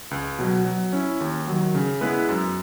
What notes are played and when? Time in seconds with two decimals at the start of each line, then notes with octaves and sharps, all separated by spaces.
0.11 C#2
0.39 B2 F#3
0.65 F#3
0.93 C#4 E4
1.20 D#2
1.48 D#3 F#3
1.75 C#3
2.01 G#3 B3 E4 B4
2.29 F#2